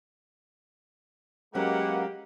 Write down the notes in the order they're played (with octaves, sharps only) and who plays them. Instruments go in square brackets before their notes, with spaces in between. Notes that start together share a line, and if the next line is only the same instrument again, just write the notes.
[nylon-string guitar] F#3 C#4 [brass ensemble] G#3 A#3 [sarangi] G4 [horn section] A#4 B4 F#5